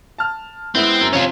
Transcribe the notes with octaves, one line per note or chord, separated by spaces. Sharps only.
A5 F6
G#3 B3 C4 E4
F#2
C3 F3 C4 C#4 F4